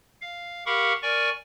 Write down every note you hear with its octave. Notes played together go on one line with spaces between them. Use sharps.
F5
G4 A#4 F5 F#5 B5 C#6
A#4 D5 G#5 C#6